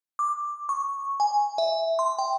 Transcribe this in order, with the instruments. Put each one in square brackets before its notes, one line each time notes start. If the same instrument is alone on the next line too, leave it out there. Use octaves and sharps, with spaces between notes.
[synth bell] D6
C#6
G#5
E5
C6
G5